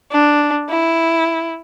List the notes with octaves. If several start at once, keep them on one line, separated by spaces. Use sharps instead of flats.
D4
E4